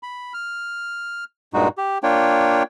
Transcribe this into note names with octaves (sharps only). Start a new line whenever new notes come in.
B5
F6
G2 A#2 G#3 D#4 F#4
G4
A#3 D4 F4 C#5 G5